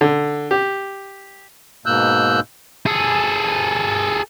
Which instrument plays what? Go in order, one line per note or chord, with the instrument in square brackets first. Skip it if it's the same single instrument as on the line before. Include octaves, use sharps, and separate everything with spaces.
[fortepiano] D3
G4
[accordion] G#2 B2 A#3 E6 F#6 G6
[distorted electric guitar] G#4 A4